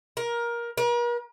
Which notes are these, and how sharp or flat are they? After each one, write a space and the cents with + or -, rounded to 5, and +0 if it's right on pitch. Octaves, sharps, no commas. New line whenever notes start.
A#4 +20
A#4 +45